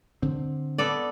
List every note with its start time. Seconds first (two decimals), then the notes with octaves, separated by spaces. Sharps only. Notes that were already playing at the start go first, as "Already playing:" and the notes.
0.22 D3 C4
0.78 B3 A4 D5